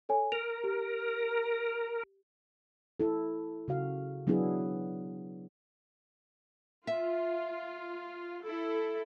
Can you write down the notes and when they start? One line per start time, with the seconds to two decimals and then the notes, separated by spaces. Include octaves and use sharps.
0.09 A4 C#5 G#5
0.32 A#4 F7
0.63 G4
3.00 E4 A4
3.68 C#3 F#4 F5
4.27 F#3 B3 D4 E4 G#4
6.87 F4 E5
8.43 E4 A4